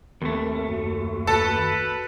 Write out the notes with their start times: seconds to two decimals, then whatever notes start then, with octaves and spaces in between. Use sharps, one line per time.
0.22 D#2 A3 C4 A#4 E5
0.68 F#2 F#4
1.27 A4 B4